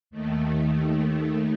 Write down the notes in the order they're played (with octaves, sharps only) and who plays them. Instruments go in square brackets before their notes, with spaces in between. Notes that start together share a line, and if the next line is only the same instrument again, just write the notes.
[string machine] D#2 D#3 A3